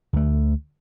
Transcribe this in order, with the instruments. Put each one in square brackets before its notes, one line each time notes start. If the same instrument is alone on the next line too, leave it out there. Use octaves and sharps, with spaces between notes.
[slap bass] D2 A3